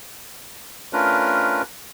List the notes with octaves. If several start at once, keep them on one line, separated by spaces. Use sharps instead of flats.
A3 C#4 D4 F4 A#4 B4